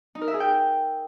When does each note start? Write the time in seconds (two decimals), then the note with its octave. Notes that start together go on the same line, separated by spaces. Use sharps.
0.15 D#4
0.21 A#4
0.28 E5
0.34 G#4
0.40 G5